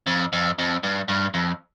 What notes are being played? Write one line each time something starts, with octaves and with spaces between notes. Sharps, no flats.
F2
F2
F2
G2
G2
F2